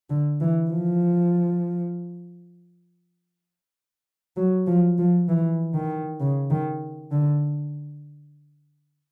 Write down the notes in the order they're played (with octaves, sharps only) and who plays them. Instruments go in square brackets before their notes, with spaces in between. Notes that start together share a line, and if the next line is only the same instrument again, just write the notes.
[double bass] D3
E3
F3
F#3
F3
F3
E3
D#3
C#3
D#3
D3